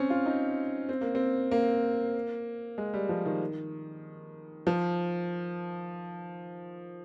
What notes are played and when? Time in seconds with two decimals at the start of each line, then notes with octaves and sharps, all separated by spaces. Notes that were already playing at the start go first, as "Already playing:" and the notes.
Already playing: C4 C#4
0.10 F4
0.26 D#4
0.89 C4
1.01 A#3
1.15 C4
1.51 A#3
2.78 G#3
2.94 G3
3.09 F3
3.26 D#3
4.67 F3